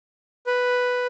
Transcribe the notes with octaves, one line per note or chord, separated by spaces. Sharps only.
B4